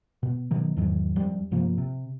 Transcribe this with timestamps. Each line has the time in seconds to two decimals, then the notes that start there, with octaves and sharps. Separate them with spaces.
0.23 B2
0.51 B2 D#3 F#3
0.77 E2 G#2 D#3 F#3
1.16 F2 G3
1.51 G1 C3 F3 A#3
1.78 C3